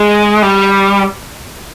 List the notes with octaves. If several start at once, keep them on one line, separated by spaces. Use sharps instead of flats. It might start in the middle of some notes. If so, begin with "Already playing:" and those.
Already playing: G#3
G3